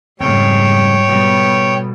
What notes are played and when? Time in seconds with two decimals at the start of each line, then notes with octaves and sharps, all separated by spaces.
0.20 F2 G#2 C#3 G3 C#5 G5
1.09 B2 G3 B3